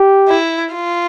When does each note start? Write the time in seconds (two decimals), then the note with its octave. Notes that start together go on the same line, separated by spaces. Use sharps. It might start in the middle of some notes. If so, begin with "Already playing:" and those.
Already playing: G4
0.28 E4
0.74 F4